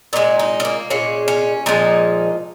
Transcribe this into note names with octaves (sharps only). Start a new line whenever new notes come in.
A#2 F3 G#3 D#4
D#4
C#4
A#3
A#2 G#3 C#4
C#4
A#2 F3 G#3 D#4